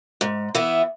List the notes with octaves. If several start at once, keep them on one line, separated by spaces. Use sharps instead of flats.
G#2
E3 B3 E4